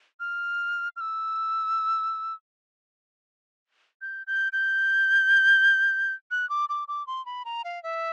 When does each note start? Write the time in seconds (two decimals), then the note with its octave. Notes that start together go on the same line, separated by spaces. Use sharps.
0.20 F6
0.96 F6
1.01 E6
4.01 G6
4.27 G6
4.53 G6
6.31 F#6
6.49 D6
6.69 D6
6.88 D6
7.07 C6
7.26 B5
7.45 A#5
7.64 F5
7.83 E5